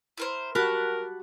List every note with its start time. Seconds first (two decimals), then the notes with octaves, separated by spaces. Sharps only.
0.18 E4 A#4 C5
0.55 F#4 G4 A#4 F#5 A5 B5